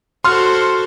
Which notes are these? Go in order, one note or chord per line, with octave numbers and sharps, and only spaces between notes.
F#4 A4 C5 C6 F6